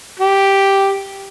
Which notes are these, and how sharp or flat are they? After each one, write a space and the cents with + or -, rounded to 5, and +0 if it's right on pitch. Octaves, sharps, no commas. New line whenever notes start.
G4 +0